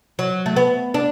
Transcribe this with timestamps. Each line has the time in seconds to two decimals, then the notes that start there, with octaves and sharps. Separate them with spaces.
0.19 F#3
0.46 A3
0.56 B3
0.94 D4